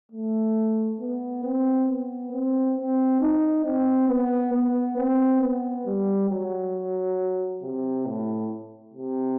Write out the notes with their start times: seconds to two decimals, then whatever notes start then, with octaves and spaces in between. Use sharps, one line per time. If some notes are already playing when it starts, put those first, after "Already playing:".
0.12 A3
1.00 B3
1.44 C4
1.88 B3
2.32 C4
2.77 C4
3.21 D#4
3.65 C4
4.09 B3
4.53 B3
4.97 C4
5.41 B3
5.86 G3
6.29 F#3
7.62 C3
8.06 A2
8.94 C3